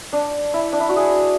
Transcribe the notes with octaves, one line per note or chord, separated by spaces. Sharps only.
D4
E4
D4
E4
F#4
G#4